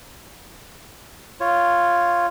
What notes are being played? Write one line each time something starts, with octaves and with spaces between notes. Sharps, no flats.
F4 C#5